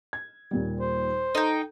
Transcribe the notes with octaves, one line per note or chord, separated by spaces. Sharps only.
G#6
D#2 A#2 G3
C5
D#4 A4 G5